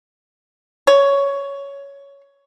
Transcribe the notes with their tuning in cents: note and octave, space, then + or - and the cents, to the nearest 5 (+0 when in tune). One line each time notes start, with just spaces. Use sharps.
C#5 +10